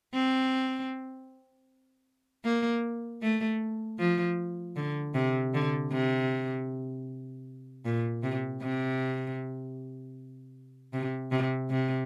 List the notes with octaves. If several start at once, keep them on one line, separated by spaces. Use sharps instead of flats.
C4
A#3
A3
F3
D3
C3
D3
C3
A#2
C3
C3
C3
C3
C3